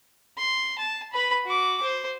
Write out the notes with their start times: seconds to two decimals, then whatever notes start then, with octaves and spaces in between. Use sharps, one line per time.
0.37 C6
0.78 A5
1.13 B4 B5
1.46 F#4 D6
1.83 C5